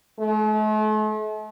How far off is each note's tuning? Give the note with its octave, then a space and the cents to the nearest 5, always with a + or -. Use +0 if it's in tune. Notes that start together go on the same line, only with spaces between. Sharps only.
A3 -45